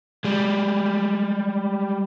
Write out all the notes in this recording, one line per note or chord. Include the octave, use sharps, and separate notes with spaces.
G3 G#3